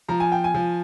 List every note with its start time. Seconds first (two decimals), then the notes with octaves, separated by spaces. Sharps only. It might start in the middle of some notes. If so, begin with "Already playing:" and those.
0.09 F3 A#5
0.20 G#5
0.32 G5
0.44 G#5
0.54 F3